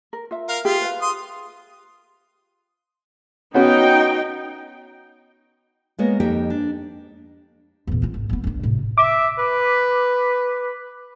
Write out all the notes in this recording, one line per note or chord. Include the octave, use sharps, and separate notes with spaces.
A#4
F4 E5
A#4 F5
F4 G4 G#4 G5
B4 F5
C6 D#6
B3 C#4 D#4 F#4 G5
G#3 A#3 B3 C#5
F2 A#3 D#4 G4 A#4 G5
D4
E2 A#2
C4 F4
G#1
G#3 B3
G1 D4
A2 C3
E5 D6
B4